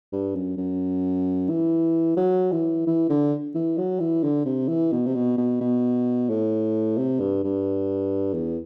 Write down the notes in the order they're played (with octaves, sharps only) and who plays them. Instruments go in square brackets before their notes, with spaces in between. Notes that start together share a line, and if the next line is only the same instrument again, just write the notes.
[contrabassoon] G2
F#2
F#2
E3
F#3
E3
E3
D3
E3
F#3
E3
D3
C3
E3
B2
C3
B2
B2
B2
A2
C3
G2
G2
E2